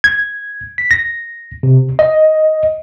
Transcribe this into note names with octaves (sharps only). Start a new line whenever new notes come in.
G#6
B6
A#6
C3
D#5